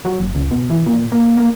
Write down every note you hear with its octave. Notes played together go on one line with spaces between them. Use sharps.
F#3
F#1
C#2
B2
E3
A#2
A#3
A#3